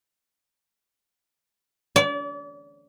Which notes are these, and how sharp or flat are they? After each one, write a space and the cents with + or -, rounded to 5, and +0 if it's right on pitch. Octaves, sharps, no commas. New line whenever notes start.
D5 -35